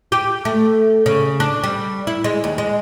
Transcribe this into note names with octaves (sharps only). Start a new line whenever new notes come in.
G4
A3
C#3
D4
G3
E4
G#3
D#2
G#3